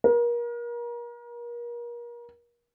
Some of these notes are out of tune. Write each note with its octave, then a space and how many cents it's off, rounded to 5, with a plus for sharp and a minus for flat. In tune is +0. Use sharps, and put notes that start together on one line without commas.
A#4 +35